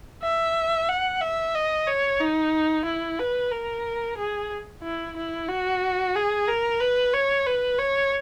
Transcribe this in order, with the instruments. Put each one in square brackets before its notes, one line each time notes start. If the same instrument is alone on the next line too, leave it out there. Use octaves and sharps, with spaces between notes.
[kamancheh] E5
F#5
E5
D#5
C#5
D#4
E4
B4
A#4
G#4
E4
E4
F#4
G#4
A#4
B4
C#5
B4
C#5